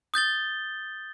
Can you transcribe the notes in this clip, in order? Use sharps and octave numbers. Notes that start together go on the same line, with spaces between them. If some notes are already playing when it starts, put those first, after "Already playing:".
D#6 G6 A6 G7